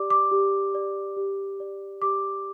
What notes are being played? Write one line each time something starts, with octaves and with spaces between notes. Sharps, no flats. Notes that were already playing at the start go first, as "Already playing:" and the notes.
Already playing: G4 D5 D6
D6
G4
D5
G4
D5
G4 D6